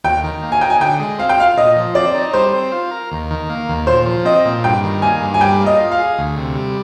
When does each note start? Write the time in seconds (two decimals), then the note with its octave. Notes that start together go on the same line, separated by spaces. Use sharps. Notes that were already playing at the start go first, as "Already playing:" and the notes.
0.04 D#2 G5
0.24 D#3
0.43 A#3
0.52 G#5
0.61 D#4 G5
0.70 G#5
0.80 D3 G5
0.99 G#3
1.18 C4 F5
1.29 G5
1.38 F4 F5
1.58 A#2 D#5
1.76 F3
1.95 C4 D5
2.14 D#4
2.33 G3 C5
2.53 C4
2.72 F4
2.91 A#4
3.11 D#2
3.30 D#3
3.50 A#3
3.69 D#2
3.87 A#2 C5
4.06 F3
4.25 C4 D#5
4.45 A#2
4.64 G2 G5
4.83 D#3
5.02 A#3 G#5
5.21 G2
5.34 G#5
5.41 G3 G5
5.60 A#3
5.66 D#5
5.79 F4
5.91 F5
5.98 G#4
6.18 D2
6.37 C3
6.55 G3